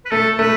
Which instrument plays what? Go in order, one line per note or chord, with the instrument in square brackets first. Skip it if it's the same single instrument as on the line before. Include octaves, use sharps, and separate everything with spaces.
[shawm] B4
[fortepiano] A3 [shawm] A4
[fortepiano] A3 [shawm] B4